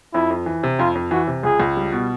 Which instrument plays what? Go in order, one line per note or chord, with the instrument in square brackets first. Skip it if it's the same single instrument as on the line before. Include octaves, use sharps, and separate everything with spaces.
[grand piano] F2 [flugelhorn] E4
[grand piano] F2
E3
C3
[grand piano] F2 [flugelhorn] F4
[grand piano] F2
[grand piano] E3 [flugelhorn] F#4
[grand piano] C3
[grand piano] C#2 [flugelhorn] G#4
[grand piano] C#2
G3
B2